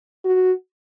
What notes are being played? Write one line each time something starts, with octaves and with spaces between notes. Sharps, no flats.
F#4